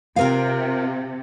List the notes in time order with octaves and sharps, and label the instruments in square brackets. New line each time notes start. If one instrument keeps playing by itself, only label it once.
[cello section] C3 [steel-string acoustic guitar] F4 A#4 F5